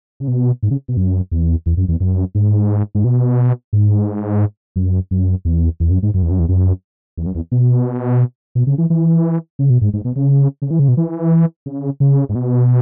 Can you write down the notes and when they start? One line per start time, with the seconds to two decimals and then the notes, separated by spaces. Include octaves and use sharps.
0.20 C#3
0.28 B2
0.63 G#2
0.71 C#3
0.88 B2
0.97 F#2
1.32 E2
1.66 E2
1.77 F#2
1.88 E2
2.00 F#2
2.35 G#2
2.95 G#2
3.04 B2
3.73 G#2
4.76 F#2
5.11 F#2
5.45 E2
5.80 E2
5.90 F#2
6.03 G#2
6.14 F#2
6.23 E2
6.31 F#2
6.39 E2
6.49 F#2
7.18 E2
7.26 F#2
7.35 E2
7.52 B2
8.55 B2
8.67 C#3
8.78 E3
8.90 E3
9.59 C#3
9.70 B2
9.81 G#2
9.93 G#2
10.05 B2
10.16 C#3
10.62 C#3
10.71 E3
10.79 C#3
10.88 B2
10.97 E3
11.66 C#3
12.00 C#3
12.29 G#2
12.35 B2